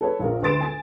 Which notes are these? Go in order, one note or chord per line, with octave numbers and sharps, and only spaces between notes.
A4 B4 C#5
A#1 F4 A#4
D2 B4 C6 A6 D7 E7
G#5 A6